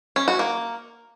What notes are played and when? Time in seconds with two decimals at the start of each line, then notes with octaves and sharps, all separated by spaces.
0.16 C#4
0.28 F#4
0.39 A#3